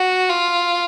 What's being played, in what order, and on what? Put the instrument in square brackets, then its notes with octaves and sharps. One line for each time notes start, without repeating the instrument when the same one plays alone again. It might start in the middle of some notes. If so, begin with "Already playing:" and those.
Already playing: [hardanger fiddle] F#4
F4